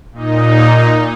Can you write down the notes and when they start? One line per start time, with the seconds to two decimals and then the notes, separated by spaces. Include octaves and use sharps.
0.12 A#2 D#4